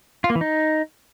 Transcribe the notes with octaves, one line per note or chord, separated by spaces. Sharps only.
F4
A#3
E3
D#4